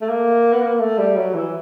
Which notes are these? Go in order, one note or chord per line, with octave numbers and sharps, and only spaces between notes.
A3
A#3
B3
A#3
A3
G3
F#3
E3